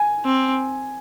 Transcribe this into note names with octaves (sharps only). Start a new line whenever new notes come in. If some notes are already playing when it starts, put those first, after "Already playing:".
Already playing: G#5
C4